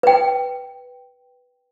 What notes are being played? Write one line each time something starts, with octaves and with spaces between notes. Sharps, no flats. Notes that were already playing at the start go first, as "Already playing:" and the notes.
B4 G5